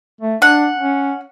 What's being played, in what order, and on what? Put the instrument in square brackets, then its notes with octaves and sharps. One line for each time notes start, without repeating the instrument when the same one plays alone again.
[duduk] A3
[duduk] D4 [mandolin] F#5
[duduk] C#4